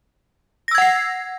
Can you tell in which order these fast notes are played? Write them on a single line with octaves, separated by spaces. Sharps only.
A#6 E6 G#6 F#5 C7